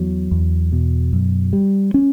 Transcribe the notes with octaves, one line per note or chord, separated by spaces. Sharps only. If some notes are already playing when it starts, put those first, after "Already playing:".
Already playing: E2 F#3
E2
B2
F#2
G3
C#4